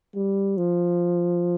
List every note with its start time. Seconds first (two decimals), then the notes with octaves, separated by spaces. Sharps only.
0.15 G3
0.57 F3